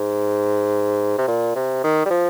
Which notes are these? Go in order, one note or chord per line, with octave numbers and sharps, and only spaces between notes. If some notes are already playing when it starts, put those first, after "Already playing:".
Already playing: G#2
C3
A#2
C3
D#3
G3
F3